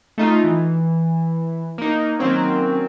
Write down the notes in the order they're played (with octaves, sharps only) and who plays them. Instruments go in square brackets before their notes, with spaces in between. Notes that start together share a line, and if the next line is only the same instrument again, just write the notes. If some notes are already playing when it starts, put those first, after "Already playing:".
[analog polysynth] A3 D#4 F4
E3
A#3 D#4
D#3 F#3 A#3 C4 C#4